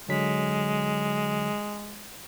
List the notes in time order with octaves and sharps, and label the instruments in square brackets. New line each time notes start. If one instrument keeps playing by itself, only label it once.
[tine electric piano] D3 F#3 B6 [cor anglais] G#3